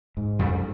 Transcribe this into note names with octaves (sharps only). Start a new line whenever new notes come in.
G#2
F2 G3